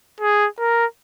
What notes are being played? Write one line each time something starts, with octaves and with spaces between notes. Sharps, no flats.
G#4
A#4